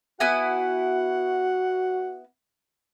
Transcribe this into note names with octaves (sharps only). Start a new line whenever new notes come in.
B3 E4 F#4 F#5 G#5